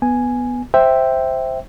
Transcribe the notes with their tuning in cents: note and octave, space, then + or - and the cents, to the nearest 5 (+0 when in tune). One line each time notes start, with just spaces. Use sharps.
B3 +0 G#5 +0
C5 +0 E5 +0 G5 +0